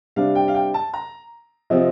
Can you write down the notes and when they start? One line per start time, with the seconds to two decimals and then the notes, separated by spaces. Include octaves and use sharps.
0.16 C3 G3 D4 F5
0.35 G5
0.48 F5
0.55 G5
0.74 A5
0.94 A#5
1.70 C3 F3 C4 F4 D#5